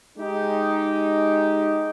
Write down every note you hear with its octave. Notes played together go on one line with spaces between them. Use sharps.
G#3 D#4 G4